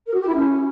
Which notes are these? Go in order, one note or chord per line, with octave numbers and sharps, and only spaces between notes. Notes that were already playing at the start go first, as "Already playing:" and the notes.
A#4
F#4
G4
E4
C#4